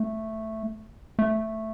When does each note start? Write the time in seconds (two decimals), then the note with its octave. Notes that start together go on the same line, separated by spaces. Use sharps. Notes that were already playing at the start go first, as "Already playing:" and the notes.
Already playing: A3
1.19 A3